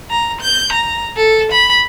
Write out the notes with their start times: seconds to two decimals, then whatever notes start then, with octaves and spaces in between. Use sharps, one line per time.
0.10 A#5
0.41 G6
0.72 A#5
1.16 A4
1.52 B5